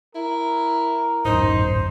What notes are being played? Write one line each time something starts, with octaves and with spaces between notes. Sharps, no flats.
E4 A#4
D1 G#1 F#2 D#4 C5